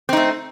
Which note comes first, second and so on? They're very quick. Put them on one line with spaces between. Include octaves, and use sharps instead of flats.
C4 D#4 A3